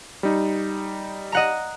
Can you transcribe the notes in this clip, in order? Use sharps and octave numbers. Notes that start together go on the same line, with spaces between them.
G3 D#4
D#5 F#5 A#5